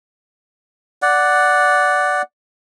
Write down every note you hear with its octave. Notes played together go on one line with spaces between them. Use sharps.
D5 F#5